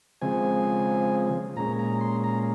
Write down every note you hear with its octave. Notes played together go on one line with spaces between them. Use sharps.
C#3 F3 G#3 C4 G#5
A#2 G#3 C#4 A#5
A#5
C6
A#5